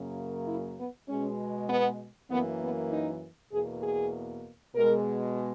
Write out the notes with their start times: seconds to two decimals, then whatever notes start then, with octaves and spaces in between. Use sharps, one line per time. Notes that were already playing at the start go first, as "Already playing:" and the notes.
Already playing: F#2 C#3 F#3 A#3
0.48 E4
0.78 B3
1.09 B2 G#3 C#4
1.70 B3
2.31 F#2 E3 A#3 B3
2.61 B3
2.92 D#4
3.52 E2 B2 A#3 G#4
3.83 G#4
4.75 B2 G#3 A#4